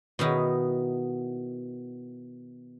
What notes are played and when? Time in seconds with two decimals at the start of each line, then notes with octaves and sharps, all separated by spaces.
0.19 B2 D#3 B3 D#4 E4